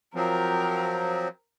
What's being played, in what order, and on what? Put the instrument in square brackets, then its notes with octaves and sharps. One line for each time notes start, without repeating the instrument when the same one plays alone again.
[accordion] F3 F#3 C4 [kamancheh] A#4